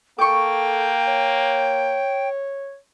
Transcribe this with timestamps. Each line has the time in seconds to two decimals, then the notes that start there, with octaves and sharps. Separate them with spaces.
0.18 A#3 A4 G5 C#6 D6
1.07 C#5